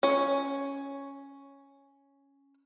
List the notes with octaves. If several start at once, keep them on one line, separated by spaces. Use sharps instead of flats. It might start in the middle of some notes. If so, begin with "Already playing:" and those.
C#4 C#5